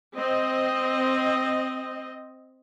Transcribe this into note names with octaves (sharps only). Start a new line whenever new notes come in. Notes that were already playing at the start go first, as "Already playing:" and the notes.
C4 D#5